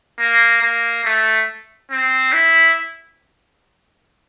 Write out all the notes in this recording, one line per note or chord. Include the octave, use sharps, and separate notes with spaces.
A#3
A#3
A3
C4
E4